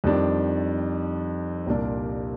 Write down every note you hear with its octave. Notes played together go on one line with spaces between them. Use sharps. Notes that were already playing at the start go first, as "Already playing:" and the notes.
F2 D#3 G3 D4
C2 A#2 G3 A#3 D4